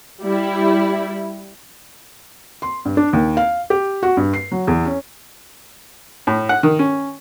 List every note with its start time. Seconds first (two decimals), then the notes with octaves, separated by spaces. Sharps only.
0.23 G3 E4
2.62 C6
2.85 G2
2.97 D4
3.13 D#2
3.37 F5
3.70 G4
4.03 F#4
4.17 G2
4.34 C7
4.52 F#3
4.67 E2
4.85 C#4
6.27 A2
6.49 F#5
6.63 D#3
6.79 C#4